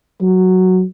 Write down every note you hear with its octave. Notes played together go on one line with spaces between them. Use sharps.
F#3